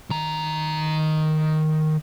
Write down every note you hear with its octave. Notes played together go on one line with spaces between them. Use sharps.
D#3 A#5